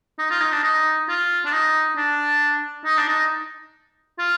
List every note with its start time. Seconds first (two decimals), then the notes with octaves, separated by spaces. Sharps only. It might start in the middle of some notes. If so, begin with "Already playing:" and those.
0.19 D#4
0.30 F4
0.41 D#4
0.52 D4
0.63 D#4
1.08 F4
1.45 D4
1.52 D#4
1.97 D4
2.85 D#4
2.97 D4
3.08 D#4
4.19 F4